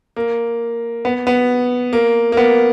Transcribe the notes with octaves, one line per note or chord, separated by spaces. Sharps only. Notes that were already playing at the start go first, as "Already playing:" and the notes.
A#3
B3
B3
A#3
A#3
B3